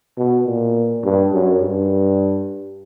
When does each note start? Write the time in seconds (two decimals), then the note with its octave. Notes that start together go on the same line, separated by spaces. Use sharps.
0.17 B2
0.46 A#2
1.04 G2
1.33 F#2
1.62 G2